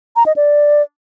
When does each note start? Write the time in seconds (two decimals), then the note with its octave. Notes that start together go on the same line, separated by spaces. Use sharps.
0.16 A#5
0.26 D#5
0.36 D5